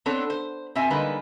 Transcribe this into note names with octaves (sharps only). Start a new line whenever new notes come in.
B3 C4 D4 A4 C#5
C5
B2 C4 E5 G#5
D3 G3 G#3 A#3 D#4 B4